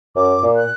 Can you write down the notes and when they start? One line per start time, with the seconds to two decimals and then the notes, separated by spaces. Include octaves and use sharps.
0.16 F#2 D6
0.43 A#2
0.56 F#6